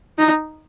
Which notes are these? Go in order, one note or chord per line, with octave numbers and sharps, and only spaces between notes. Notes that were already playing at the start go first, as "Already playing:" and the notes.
D#4